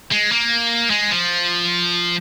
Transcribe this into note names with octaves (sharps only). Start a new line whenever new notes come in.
G#3
A#3
G#3
F3